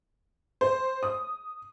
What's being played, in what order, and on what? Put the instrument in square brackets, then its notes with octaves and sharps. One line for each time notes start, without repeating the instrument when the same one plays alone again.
[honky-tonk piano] C5
D#6